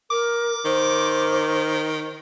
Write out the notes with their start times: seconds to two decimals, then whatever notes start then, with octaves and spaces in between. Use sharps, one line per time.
0.10 A#4 D6
0.65 D#3 C5